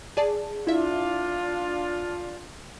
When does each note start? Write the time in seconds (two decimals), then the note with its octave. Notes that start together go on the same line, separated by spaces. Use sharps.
0.17 G#4 D5 A5
0.67 D4 E4 F4 E5